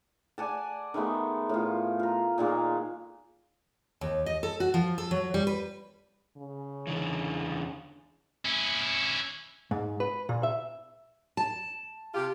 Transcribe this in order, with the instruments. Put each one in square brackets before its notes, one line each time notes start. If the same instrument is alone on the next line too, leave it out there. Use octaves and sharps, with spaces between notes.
[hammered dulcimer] D5 F#5 G#5 A5
D#3 G#3 A3 B3
A2 F4
F4 A#5
A#2 D#3 G#3 A#3
[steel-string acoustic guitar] D#2
D#5
A4
F#4
F3
A4
F#3
G3
B4
[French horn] C#3
[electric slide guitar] E2 D3 E3
[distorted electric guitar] C#4 E4
[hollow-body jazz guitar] G#2
B4
A#2
E5
[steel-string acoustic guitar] A5
[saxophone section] C3 F4 G4